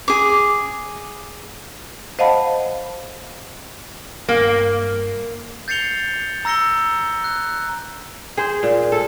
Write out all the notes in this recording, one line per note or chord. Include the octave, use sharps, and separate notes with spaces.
G#4 D6
C5 D#5 F5 F#5 A5 B5
G2 A#3
G6 A6 C7 C#7 F7 G7
A#5 E6 A#6 C#7 G7
F#6
G#4 C5
A#2
A4